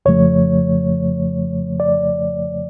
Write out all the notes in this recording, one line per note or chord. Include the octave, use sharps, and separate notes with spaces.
F2 C#3 F3 A3 C#5
D5